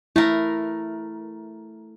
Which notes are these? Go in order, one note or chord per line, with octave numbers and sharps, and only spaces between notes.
A3 E4 A#4